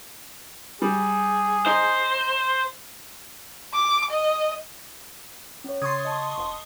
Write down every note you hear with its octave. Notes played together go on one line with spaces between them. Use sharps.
G3 G#4
D#4 C5
D6
D#5
C#4 C#5
C#3 C6 C#6 D#6 G#6 A6
D#5 A5
E1